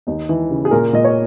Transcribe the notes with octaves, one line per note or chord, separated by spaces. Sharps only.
D#2 D#4
E3
C#3
G#4
A#2 A#4
A#2 D#5
C#5